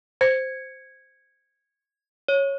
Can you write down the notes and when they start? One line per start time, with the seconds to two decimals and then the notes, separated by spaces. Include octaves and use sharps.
0.21 C5 G#6 C#7
2.28 C#5